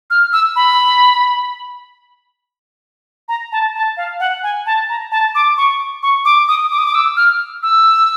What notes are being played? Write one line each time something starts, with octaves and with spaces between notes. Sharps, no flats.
F6
E6
B5
A#5
A5
A5
F5
F#5
G#5
A5
A#5
A5
D6
C#6
C#6
D6
D#6
D6
D#6
D6
E6
F6
E6